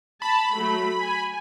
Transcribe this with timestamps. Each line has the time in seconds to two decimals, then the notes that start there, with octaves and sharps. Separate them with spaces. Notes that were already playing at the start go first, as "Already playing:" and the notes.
0.22 A5 B5
0.54 F#3 A3
1.02 G#5